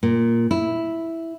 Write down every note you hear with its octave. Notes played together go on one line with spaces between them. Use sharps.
A#2
E4